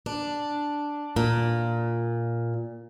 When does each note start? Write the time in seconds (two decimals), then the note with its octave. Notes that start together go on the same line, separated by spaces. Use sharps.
0.06 D4
1.16 A#2